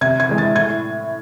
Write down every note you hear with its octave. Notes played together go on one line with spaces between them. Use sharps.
C3 G#6
G#6
E3 G#3
A6
A2 G#6